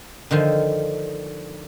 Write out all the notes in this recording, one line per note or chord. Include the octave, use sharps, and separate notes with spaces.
D3 D#3 F3